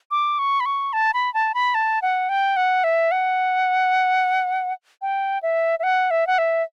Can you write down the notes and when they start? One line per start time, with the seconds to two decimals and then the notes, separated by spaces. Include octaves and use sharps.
0.11 D6
0.39 C#6
0.60 B5
0.66 C#6
0.93 A5
1.14 B5
1.34 A5
1.54 B5
1.75 A5
2.02 F#5
2.29 G5
2.56 F#5
2.84 E5
3.11 F#5
5.02 G5
5.43 E5
5.79 E5
5.83 F#5
6.11 E5
6.27 F#5
6.38 E5